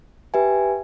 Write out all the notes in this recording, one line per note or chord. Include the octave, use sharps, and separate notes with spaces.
G4 B4 E5 G#5